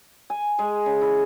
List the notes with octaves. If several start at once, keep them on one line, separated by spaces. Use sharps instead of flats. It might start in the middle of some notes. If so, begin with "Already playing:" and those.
G#5
G#3
C#3
E4